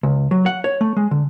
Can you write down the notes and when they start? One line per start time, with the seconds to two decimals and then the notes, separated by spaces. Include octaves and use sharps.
0.03 C#2
0.31 F#3
0.46 F#5
0.64 C#5
0.81 A3
0.97 G#3
1.11 D3